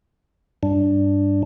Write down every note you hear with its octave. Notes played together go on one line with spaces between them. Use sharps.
G2 D4